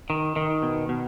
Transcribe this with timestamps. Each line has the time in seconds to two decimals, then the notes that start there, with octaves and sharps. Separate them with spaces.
0.10 D#3
0.36 D#3
0.62 B2
0.89 B2